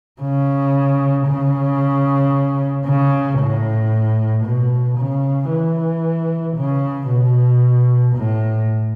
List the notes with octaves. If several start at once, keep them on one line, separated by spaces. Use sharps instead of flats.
C#3
C#3
C#3
A2
B2
C#3
E3
C#3
B2
A2